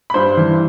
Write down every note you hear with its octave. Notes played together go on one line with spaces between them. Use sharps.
B5
G2 C5 C6
E3